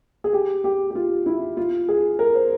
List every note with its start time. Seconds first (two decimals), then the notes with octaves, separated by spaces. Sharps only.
0.24 G#4
0.33 G4
0.64 G4
0.90 G4
0.95 F4
1.26 E4
1.57 F4
1.89 G#4
2.19 A#4
2.35 C5